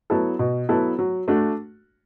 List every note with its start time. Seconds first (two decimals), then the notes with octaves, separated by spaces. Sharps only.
0.10 F#3 B3 E4 A4
0.39 B2
0.69 F#3 B3 E4 A4
0.99 F#3
1.28 A3 D4 F#4